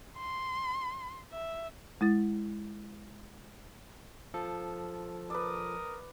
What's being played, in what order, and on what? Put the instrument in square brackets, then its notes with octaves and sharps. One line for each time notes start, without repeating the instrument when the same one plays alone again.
[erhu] C6
E5
[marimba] G#3 E4 A6
[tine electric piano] F3 A4
[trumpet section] A#4 D#6 [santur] B4 D5